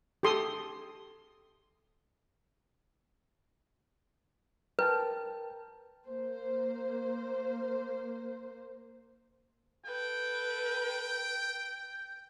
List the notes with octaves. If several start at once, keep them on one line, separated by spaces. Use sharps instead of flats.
G4 A4 C6 D#6
A#4 B4 G5 A5
A#3 C5
A4 B4 G5